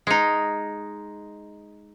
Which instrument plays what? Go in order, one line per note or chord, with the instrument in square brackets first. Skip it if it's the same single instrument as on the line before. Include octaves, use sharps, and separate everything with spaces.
[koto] G#3 D#4